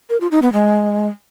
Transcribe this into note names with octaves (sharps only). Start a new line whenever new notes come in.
A#4
F4
D#4
B3
G#3